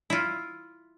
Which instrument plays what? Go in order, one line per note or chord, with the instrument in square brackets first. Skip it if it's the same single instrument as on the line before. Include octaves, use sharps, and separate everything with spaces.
[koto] E4 F4